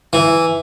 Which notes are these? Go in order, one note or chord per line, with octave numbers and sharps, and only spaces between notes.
E3